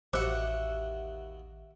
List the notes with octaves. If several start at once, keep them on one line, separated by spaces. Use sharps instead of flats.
A1 D#2 F#4 C5 E5 F#5 D6 F#6